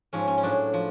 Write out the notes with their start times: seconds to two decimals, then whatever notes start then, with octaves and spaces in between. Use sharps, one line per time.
0.13 G#2 F3 C#4
0.28 C#4
0.38 C#4
0.43 A2 F#3 D4
0.74 F3